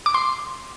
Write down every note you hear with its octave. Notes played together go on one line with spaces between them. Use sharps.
D6
C6